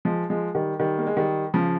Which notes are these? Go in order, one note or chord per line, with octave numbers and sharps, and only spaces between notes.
F3 G#3
F3 G#3
D#3 G3
D#3 G3
A#3
G#3
D#3 G3
C#3 F3